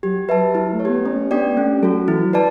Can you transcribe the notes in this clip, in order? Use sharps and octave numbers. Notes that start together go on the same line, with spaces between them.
F#3 G4
F#3 B4 E5 A5
E4
A3
C#5
B3 G4
A3 C#4
B3 D4 G4 D5 G5
A3 C#4
F#3 F#4 A4
E3 E4
F#3
B4 D5 A5